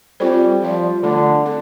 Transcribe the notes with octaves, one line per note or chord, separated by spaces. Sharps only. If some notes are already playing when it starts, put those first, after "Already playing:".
G3 C4 F4 A4 C5
F3 G3 F4 D5
D3 A3 D4 F4
C4 A4